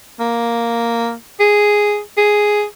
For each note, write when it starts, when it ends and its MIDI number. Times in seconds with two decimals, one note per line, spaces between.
0.20 1.13 58
1.40 1.99 68
2.17 2.63 68